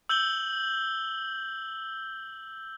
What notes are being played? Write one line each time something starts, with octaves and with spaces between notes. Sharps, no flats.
E6 G6 F#7 G7